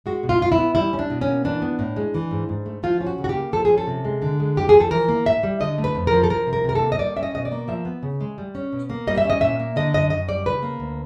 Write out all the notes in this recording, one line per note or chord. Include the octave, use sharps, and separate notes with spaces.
G#3 F#4
B2
F4
B2 F4
E4
B3
G3 E4
C#4
D4
B2
C#4
A#3
E3 D4
B3
A2
G#3
E3
G#2
G#2
A3
F3 F4
C#4
F#4
C#3
F#4
G4
A#3
F3 A4
G#4
C#4
A4
C3
G#3
D3
G#3
F2 G4
F3 G#4
A4
E3 A#4
A#3
A2 E5
G3
D3 D#5
A3
B4
F2
F3 A#4
A4
F3 A#4
C3
A#4
C3 A#4
A4
A#3
D#5
G3 D5
C#4 E5
D#5
B2 D#5
D5
A#3
F3 E5
B3
C#3
G#3
G3
C#4
B2
A#3
G3 D#5
E5
C#4
D#5
A#2 E5
A#3
D3 D#5
F#2 D#5
F#2 D#5
G3 D5
C#3 B4
A#3
D2